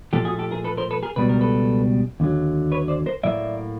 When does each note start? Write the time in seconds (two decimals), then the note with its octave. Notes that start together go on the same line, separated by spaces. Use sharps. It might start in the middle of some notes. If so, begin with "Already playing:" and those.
0.13 A#2 F3 A3 G4 A4
0.25 F#4 G#4
0.39 G4 A4
0.51 G#4 A#4
0.64 A4 B4
0.77 A#4 C5
0.91 A4 B4
1.03 G#4 A#4
1.16 C#2 B2 G3 B4
1.29 A#4
1.41 A4 B4
2.20 D#2 D3 F#3
2.72 B4 C#5
2.88 C5 D5
3.06 A#4 C5
3.24 A2 F#3 A#3 D5 E5